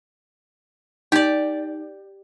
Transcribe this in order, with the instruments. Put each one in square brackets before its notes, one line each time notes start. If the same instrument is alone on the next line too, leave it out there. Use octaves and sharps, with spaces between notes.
[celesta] D#4 [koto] G4 D5